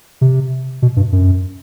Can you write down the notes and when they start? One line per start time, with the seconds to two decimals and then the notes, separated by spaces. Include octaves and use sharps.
0.21 C3
0.82 B2
0.96 G2
1.12 F#2